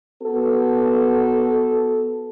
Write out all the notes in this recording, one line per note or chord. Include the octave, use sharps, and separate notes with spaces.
B3 F#4 A4